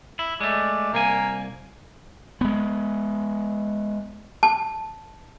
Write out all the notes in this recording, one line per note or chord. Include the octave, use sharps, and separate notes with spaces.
E4
G#3 A3 D5
C2 A#3 G#5
G#3 B3
A5